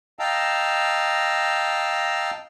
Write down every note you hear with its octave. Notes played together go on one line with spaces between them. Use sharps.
D#5 F5 G5 A5 A#5 E6